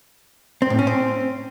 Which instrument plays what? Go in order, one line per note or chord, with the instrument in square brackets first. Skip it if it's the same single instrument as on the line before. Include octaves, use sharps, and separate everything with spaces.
[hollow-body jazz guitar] C4
A2
C#4
C4